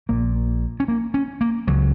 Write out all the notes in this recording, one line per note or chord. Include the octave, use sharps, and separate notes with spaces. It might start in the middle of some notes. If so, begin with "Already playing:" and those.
A#1 A#2 A#3
C#4
A#3
C#4
A#3
C#2 C#3 F#3